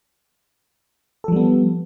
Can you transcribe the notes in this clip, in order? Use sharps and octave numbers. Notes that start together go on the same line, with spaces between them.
F3 G3 B3 A4